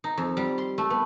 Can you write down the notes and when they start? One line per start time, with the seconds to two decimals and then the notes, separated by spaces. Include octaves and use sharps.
0.04 D#4
0.17 F2
0.37 G3
0.58 C6
0.78 A3
0.90 B3